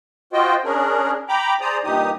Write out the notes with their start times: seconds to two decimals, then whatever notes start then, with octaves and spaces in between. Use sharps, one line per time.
0.33 F4 F#4 C5 D#5 G5
0.64 C#4 D4 G#4 A#4
1.29 G5 A#5 B5 D6
1.61 G#4 C5 D5 A#5 D#6
1.84 G2 A#2 E3 D#4 G4 D#6